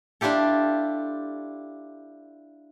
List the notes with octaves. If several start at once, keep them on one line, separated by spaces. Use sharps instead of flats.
D4 E4 F4 G4 A4